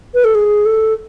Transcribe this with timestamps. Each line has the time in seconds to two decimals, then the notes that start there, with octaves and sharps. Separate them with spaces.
0.14 B4
0.24 A4
0.35 G#4
0.65 A4